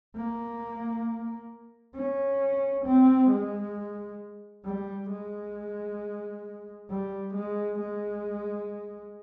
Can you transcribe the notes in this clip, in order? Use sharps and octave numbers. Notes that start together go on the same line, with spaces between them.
A#3
C#4
C4
G#3
G3
G#3
G3
G#3
G#3